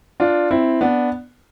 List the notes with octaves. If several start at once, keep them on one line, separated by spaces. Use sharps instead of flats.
D4 F4
C4 E4
B3 D4